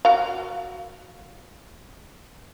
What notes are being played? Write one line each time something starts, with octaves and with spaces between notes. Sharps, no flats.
F#4 A#4 F5